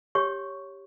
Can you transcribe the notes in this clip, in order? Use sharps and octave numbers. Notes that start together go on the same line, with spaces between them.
G4 C#5 C#6